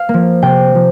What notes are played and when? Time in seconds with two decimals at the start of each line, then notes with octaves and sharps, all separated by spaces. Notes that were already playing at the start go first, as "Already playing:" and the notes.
Already playing: F5
0.09 A#3
0.14 F3
0.42 C3 G5
0.75 F3